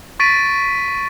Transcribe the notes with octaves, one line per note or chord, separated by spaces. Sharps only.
C#6 A6 B6 D7 D#7